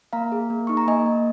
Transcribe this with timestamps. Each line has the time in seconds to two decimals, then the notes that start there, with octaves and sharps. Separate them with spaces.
0.13 A#3 F5 A#5
0.32 G#4
0.50 A#3
0.67 D#4 C#6
0.77 A#5
0.87 A#3 D#5 G#5
1.06 A#3